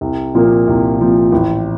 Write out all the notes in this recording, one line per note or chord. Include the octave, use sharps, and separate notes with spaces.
C2
A#2 F3 A#3
C2
A#2 F3 A#3
A1